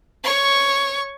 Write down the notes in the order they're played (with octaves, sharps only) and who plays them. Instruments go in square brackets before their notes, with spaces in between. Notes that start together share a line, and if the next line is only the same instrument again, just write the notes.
[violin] C#5 C#6